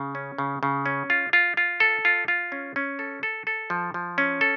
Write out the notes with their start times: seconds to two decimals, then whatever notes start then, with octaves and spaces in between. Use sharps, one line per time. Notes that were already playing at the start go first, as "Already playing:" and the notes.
Already playing: C#3
0.15 C#4
0.38 C#3
0.63 C#3
0.86 C#4
1.10 F4
1.33 F4
1.57 F4
1.80 A4
2.05 F4
2.28 F4
2.52 C#4
2.76 C#4
2.99 A4
3.23 A4
3.47 A4
3.70 F3
3.94 F3
4.18 C#4
4.41 A4